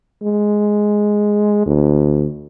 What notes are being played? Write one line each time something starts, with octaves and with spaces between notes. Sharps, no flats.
G#3
D2